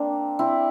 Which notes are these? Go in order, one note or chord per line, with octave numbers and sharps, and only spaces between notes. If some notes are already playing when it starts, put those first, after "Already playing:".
Already playing: A#3 C4 D4
C4 E4